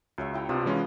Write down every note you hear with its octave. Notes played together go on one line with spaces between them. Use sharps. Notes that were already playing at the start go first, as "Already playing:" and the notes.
C#2 F#4 C#5 E5
E4 G5 A#5
C3 B3 D4 F4
E3 G#3 C#4